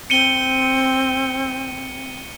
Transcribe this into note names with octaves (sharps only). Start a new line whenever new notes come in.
C4 C#7 D#7 G7